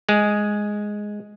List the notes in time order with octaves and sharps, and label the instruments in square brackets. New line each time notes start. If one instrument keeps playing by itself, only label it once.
[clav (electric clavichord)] G#3 G#4